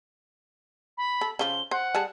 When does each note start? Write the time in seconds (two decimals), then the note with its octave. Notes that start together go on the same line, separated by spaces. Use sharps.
0.98 B5
1.21 A4
1.39 C#3 F3 G7
1.71 C5 F#5
1.95 G3 G#4 A5